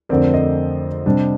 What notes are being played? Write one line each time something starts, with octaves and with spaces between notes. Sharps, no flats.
F2 D3 A3 C4 A#4 D5
C5 D#5
C3 G3 D4